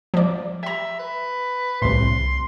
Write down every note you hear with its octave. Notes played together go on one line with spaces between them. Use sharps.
F3 D5
G4 E5 A#5
B4
C2 A2 C6